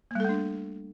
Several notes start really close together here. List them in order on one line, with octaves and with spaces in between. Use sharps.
A#3 G3 A4 A3 D4